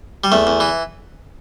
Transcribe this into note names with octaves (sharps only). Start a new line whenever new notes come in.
G3
E2 A3
E2
E3